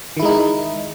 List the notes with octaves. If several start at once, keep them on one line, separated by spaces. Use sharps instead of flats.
D#3 G#3 D#4 E4